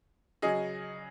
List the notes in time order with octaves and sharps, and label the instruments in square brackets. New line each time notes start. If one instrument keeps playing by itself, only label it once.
[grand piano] C#3 F#3 C#4 G#4 D#5